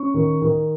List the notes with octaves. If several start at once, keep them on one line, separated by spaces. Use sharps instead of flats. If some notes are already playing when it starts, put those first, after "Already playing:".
Already playing: C#4 C#6
D#3
D#3